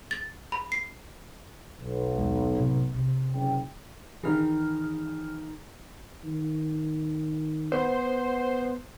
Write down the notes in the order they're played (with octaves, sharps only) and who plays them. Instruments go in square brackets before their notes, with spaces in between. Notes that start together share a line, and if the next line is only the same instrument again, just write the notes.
[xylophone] A6
B5
C7
[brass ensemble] B1
[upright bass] D#2 G#3
A2 C3
C3
[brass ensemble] F#1 C#3 G5
[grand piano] D#3 D#4 G#4 [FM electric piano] E3 F6
[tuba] D#3
[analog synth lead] B3 [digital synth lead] C5